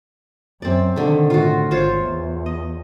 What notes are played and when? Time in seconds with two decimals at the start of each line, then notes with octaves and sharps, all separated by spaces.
0.62 F#2 C4 D5
0.96 B2 D3 D#3 A3
1.30 A2 F4 F#4
1.71 G#1 F4 C5 C#5
2.02 E2
2.46 D#5